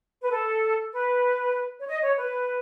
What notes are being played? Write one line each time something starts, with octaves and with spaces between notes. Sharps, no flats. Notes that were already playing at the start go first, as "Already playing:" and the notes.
B4
A4
B4
C#5
D#5
C#5
B4